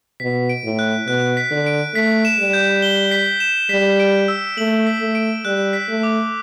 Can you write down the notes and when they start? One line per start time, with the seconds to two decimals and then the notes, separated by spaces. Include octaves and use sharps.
0.20 B2 B6
0.49 D7
0.65 A2
0.79 F#6
1.08 B2 F#6
1.37 B6
1.51 D3
1.66 D7
1.95 A3 B6
2.25 E7
2.38 G3
2.53 G6
2.82 G7
3.11 B6
3.40 E7
3.69 G3 B6
4.00 D7
4.28 E6
4.58 A3 F#7
4.86 B6
5.01 A3
5.15 D7
5.45 G3 F#6
5.73 B6
5.89 A3
6.03 D6